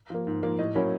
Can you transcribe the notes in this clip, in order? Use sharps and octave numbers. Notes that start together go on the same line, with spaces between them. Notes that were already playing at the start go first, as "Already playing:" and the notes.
F3 A#3
G#2
F3 A#3
A2 D#5
F#3 A#3 C#4 E4